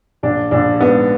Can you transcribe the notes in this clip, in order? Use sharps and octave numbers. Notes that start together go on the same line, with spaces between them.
A#1 D4
A#1 D4
G#2 B3